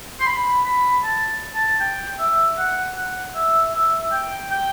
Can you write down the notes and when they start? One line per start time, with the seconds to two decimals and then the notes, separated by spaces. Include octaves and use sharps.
0.20 C6
0.26 B5
0.65 B5
1.03 A5
1.55 A5
1.80 G5
2.19 E5
2.58 F#5
2.96 F#5
3.35 E5
3.74 E5
4.12 G5
4.51 G5